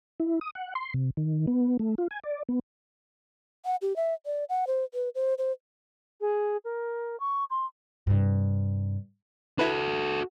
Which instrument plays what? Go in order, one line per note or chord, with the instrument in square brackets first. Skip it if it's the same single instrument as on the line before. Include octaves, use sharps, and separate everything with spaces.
[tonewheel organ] E4
D#6
F#5
C6
C3
D#3
B3
A3
F4
G#5
D5
B3
[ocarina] F#5
G4
E5
D5
F#5
C5
B4
C5
C5
[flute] G#4
A#4
C#6
C6
[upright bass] G2 C3
[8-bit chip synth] E4 B4 [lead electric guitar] F#4 A4